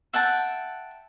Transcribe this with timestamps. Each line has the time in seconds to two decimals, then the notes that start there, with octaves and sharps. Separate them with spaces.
0.13 E5 F#5 G5 A5